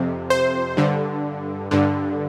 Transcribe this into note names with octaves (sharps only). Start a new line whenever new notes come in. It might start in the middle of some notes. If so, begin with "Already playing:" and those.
Already playing: F2 C3
C5
G2 D3
G2 D3